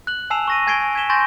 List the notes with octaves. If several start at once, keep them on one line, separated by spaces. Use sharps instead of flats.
F#6 F#7
G#5 A5 E6 C7 E7 F7
C#6 A#6 D#7
G#5 G#6 A6 C7 D7 G7
G#6 B6 E7 G7
G#5 C6 C#6 G6 A6 A#6